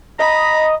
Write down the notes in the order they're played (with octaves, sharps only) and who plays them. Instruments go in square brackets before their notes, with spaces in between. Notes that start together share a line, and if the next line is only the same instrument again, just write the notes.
[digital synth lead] D#5 [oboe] A#5 [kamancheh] B5